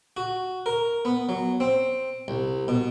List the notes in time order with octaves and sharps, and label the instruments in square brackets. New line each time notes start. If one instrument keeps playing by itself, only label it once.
[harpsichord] F#4
A#4
B3
F#3
C4
C2
B2